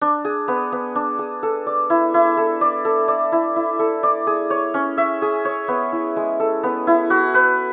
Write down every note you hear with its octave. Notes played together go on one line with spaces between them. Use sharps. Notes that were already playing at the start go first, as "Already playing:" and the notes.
D4
G#4
B3
B3
D4
G#4
A4
D5
E4
E4
A4
D5
A4
D5
E4
E4
A4
D5
G#4
C#5
C#4
E5
G#4
C#5
B3
E4
G#3
A4
B3
E4
F#4
B4